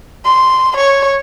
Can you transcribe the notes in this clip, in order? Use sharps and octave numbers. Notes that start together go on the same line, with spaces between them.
C6
C#5